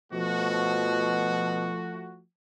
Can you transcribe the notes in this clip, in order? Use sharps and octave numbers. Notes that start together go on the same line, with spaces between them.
B2 F3 A3 F#4